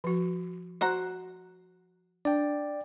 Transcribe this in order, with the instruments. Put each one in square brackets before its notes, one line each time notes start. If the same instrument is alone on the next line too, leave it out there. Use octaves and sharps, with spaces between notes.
[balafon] F3 F#4
[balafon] F#4 [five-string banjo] C5 F#5 A#5
[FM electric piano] D4 [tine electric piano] D5 G5